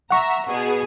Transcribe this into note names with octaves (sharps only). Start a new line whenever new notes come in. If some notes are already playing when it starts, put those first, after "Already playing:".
E5 F#5 A#5 C#6
B2 G#4